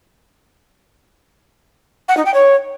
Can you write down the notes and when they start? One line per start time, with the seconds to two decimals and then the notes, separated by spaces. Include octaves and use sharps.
2.08 F#5
2.17 D#4
2.25 G5
2.34 C#5